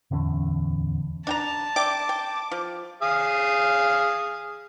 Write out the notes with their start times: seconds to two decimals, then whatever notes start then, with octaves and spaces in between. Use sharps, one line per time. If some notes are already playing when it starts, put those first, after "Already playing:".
0.11 D1 E2 D3 C#4
1.27 D4 G5 A5 A#5
1.76 D5 E5 G5 D6
2.09 G5
2.51 F3
3.02 G#4 F5 D#6